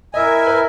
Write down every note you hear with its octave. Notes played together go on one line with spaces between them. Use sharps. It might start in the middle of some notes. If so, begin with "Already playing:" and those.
E4 A#4 D#5 E5 G#5
B4